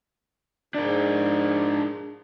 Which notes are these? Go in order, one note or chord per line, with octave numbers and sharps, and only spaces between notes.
G#2 D4 A#4